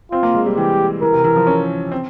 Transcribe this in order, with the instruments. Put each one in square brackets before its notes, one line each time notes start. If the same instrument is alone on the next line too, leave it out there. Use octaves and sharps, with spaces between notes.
[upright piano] C4 [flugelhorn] F4
[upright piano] A#3
G#3
G3
[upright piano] E3 [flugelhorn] G4
[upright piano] E3 [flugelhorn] A#4
[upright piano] C3
E3
F3
C#4
C4